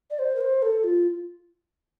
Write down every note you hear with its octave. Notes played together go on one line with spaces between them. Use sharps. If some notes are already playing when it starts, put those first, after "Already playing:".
D5
C5
A#4
C5
A4
F4